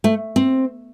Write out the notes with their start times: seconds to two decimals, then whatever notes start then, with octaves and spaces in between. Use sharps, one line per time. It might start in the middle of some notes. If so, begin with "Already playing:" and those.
0.04 A3
0.36 C4